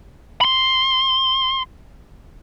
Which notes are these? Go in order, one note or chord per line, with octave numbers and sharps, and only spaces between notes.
B5 C6